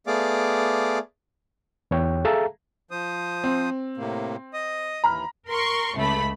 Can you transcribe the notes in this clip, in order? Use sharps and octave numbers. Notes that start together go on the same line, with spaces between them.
A3 B3 G#4 D5 F5 D6
E2 C#5 G5
G#4 A4 E5 F5 A5 A#5
F3 C5 D#6
C4
A2 C3 A#3
D#5 D#6
D#2 E3 A#5 B5 F6
A#4 C6 C#6
C#2 A3 B5